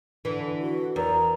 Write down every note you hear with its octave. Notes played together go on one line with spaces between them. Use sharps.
D3 E3
F#4
E2 A#4 A#5